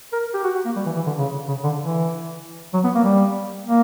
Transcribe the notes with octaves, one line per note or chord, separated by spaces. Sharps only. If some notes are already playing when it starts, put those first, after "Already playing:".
A#4
G4
F#4
F#4
A#3
G3
E3
E3
D3
C#3
C#3
D3
E3
F#3
B3
A#3
G3
A#3